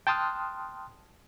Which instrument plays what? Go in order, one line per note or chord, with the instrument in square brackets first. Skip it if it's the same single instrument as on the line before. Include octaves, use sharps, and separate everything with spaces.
[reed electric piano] G5 A5 C6 D#6 F6 F#6